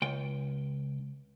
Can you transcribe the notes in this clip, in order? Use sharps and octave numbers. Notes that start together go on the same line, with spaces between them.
C#2 G5